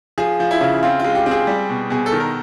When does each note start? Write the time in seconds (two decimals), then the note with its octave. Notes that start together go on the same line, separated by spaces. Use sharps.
0.18 F3 G#4
0.40 F3
0.51 E4
0.61 C#3
0.83 C4 F4
0.99 G#3 F4
1.15 G4
1.26 C4
1.31 G#4
1.47 G3
1.69 B2
1.90 B2 G#4
2.06 A4
2.12 D#3
2.20 A#4